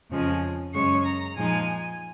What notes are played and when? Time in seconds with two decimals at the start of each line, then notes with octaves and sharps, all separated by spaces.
0.10 F2 C#3 F3 G#3 C#4
0.73 F#2 C#3 G#3 C#4 C#6
1.04 A#5
1.36 A#2 F3 G#3 D#4 G#5